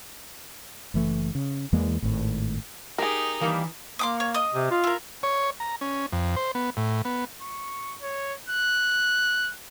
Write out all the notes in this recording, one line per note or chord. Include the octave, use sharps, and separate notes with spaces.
F#1 E3 A3
C#3
E2 E3 G#3 A#3
G#1 A2
D#4 G4 G#4 A#4
D#3 E3 G3 A#3
A#3 C6 D6 D#6
C#5
D#5 D#6
C3
F4
E4 A#4
C#5
A#5
C#4
F2
C5
B3
A2
B3
C#6
C#5
F#6